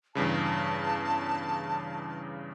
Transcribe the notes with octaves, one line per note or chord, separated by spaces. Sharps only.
E2 G2 C#3 A5